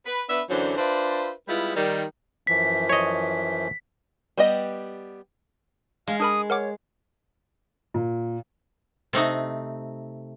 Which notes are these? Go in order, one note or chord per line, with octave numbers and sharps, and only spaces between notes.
B4
B3 D4 B4 E5
F#2 D3 E3 F#3 D4 C5
D4 F4 B4 C5 D5 E5
G3 G#3 B3 E4 F4 B4
D#3 G3
F#2 E3 F3 B6
C#5 D#5
G3 B3 G4 D#5
G#3 F5
D4 A#4 B5 D#6
A#4 C#5 F#5 D6
A#2
C3 A3 D#4